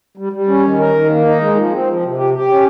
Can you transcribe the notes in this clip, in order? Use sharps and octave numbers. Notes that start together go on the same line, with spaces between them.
G3
G3
C#4
D#3
A#4
D#3
A#3
D#4
G#3
F3
C4
F3
C3
G4
G4
C#4